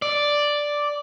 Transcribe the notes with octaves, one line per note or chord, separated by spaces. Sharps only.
D5